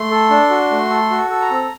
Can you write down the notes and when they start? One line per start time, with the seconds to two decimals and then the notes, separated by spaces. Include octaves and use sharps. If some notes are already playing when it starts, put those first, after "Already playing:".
Already playing: A3 C6
0.11 A4
0.30 D4
0.50 F#4
0.71 A3
0.90 A4
1.10 F#4
1.30 A4
1.41 A#5
1.51 C4